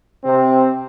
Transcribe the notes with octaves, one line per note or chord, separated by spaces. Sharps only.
C3 C4